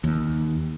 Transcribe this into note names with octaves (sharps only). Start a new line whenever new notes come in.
D#2